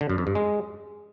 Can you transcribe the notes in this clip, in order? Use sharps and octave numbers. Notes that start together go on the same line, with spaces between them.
D3
F#2
F2
G2
G#3